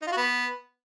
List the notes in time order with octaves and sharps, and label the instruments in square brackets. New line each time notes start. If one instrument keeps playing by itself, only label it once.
[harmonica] D#4
F4
F#4
B3